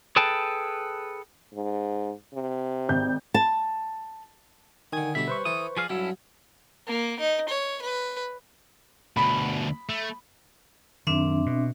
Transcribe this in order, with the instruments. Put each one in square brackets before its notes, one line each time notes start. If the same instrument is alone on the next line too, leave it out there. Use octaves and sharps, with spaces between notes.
[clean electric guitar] G#4 A4 B4 G5 A5
[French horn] G#2
C3
[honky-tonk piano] G#1 G6
[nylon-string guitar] A5
[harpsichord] D3 D#6 [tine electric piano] D#3 G#5 G#6
[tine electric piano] B2 D3 B6 [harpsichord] G3 C#4 [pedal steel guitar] E5
[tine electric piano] B4 C5 C#6
[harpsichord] E3 A4 [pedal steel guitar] D#6
[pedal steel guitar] F3 G#4 F5 [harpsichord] D5
[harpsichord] G2 F#3 [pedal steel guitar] C#4 E4 A4
[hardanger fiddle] A#3
D#4
C#5
B4
[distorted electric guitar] D2 B2 [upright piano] B5
[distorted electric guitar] A3
[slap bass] F#2 D#3 [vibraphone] C4 D4 E5
[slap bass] B2